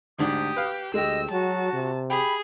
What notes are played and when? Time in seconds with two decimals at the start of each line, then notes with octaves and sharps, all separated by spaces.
0.19 D2 G#2 D4 G4 D#6
0.56 B4 F5
0.94 D2 G#3 G4 D#5 E6
1.31 F#3 F#4 A5
1.73 C3
2.10 G4 G#4 B5